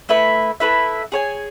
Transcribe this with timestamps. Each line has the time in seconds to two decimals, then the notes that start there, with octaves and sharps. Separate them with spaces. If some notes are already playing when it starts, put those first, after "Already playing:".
0.09 A3 E4 B4 E5
0.60 A3 E4 B4 E5
1.12 G#4 C#5 G#5